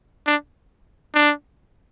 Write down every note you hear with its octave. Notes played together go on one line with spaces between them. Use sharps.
D4
D4